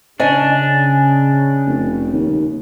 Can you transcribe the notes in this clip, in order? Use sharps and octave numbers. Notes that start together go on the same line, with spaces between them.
C#3 C#4 D4 D#5 G#5
F1
D#2